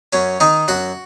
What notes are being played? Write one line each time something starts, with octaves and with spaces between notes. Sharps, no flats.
F#2 C#4 C#5
D#3 D#4 D#5
F#2 F#4 F#5